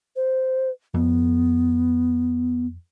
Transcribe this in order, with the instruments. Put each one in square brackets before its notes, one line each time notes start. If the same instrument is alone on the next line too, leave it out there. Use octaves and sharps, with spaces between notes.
[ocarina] C5
[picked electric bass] F2 [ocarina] B3